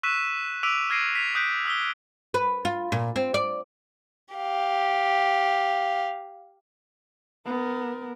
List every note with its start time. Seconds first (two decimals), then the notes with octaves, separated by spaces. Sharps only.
0.03 C#6 E6 F#6 B6 D#7 E7
0.63 D6 E6 B6 D7 D#7 F7
0.90 F6 G#6 A#6 C7 D7 D#7
1.15 B6 F7
1.35 D#6 F#6 G6 B6 D7
1.66 D#6 E6 B6 G7
2.34 B4
2.65 F4
2.92 A#2
3.16 C4
3.34 D5
4.35 G4 F5
7.46 B3 A#4